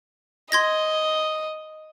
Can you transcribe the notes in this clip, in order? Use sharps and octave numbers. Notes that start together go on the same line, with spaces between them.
D#5 C6 G#6 A#6